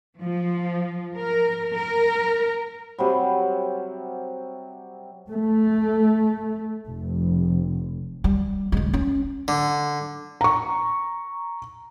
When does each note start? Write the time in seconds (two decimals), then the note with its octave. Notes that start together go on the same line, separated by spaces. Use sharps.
0.23 F3
1.16 A#4
1.76 A#4
2.98 C3 F#3 G3
5.29 A3
6.88 F1
8.24 G3
8.72 D2 G#3
8.94 C#4
9.48 D3
10.41 A#5 C#6